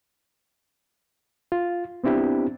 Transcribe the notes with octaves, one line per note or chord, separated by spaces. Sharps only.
F4
B3 C4 D4 E4 G4